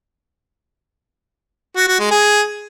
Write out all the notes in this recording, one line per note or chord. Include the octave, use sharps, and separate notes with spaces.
F#4
F#4
G#3
G#4